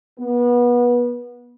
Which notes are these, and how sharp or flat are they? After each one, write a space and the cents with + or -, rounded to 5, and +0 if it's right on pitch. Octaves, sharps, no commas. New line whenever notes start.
B3 -25